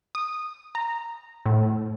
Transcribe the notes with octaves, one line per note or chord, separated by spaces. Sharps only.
D#6
A#5
A2